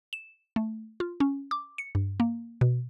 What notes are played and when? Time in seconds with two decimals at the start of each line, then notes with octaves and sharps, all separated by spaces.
0.13 E7
0.56 A3
1.00 F4
1.20 C#4
1.51 D6
1.78 C#7
1.95 G2
2.20 A#3
2.61 B2